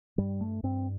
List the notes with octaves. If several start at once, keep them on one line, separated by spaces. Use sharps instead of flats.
G2 G3
A3
G2 C4